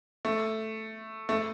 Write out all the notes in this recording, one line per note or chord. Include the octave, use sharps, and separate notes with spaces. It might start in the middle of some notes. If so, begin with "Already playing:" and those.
A3
A3